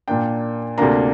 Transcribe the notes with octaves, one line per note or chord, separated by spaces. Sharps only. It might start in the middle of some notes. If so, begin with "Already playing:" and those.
A#2 A#3 D4 G5
D2 C3 A#3 D4 A#5